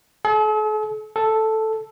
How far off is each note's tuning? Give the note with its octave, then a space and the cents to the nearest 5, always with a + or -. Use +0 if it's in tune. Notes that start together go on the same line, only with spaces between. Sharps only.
A4 -45
A4 +0